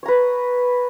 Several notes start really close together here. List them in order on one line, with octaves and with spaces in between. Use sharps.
C#5 A#5 B4